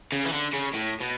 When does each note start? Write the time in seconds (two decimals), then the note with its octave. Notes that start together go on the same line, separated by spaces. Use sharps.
0.12 C#3
0.25 E3
0.33 D3
0.53 C#3
0.74 A2
1.01 B2